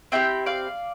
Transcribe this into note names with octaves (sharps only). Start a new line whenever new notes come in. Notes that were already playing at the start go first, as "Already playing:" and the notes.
C4 E4 G4 E5 G5
D5 F5